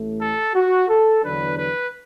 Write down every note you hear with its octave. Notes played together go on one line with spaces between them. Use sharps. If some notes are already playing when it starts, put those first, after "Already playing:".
Already playing: A1 A2 A3
A4
F#4
A4
E2 D3 F#3 D4 B4
B4